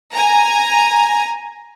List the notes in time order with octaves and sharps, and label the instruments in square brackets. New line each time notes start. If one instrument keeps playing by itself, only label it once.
[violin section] G#5 A#5